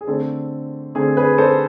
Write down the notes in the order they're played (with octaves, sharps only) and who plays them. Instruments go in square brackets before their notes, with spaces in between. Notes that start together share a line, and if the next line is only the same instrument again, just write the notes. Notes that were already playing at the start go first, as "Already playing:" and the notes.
[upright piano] G#4
D3 A3 C4 A4
D3 A3 C4 G#4
G#4 B4
A4 C5